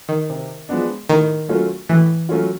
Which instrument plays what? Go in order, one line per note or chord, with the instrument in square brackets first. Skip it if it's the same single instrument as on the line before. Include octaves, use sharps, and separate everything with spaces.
[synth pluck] D#3
[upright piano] C3
F3 G#3 B3 D4
[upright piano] A2 [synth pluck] D#3
[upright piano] F#3 A3 C#4 F4
[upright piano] A2 [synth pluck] E3
[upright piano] F#3 A3 C#4 F4